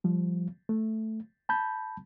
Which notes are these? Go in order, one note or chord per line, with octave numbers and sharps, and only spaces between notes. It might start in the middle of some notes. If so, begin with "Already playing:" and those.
F3 G3
A3
A5 B5 G6